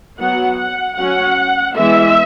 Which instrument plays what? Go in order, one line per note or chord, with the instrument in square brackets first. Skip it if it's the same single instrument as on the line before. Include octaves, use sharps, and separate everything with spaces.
[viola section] F#3 B3 F#5
F#5
F#3 C#4 F#5
E3 G#3 B3 E5